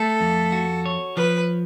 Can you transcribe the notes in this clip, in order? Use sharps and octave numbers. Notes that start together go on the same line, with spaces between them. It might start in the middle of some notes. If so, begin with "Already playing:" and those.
Already playing: A3 A4
F2
F#4
C#5
F3 B4